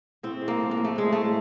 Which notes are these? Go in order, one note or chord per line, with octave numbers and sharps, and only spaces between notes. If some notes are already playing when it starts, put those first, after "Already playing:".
A2 C4
G#3
A#3
F3
A#3
A2
A3
A2 G#3
G#3 A3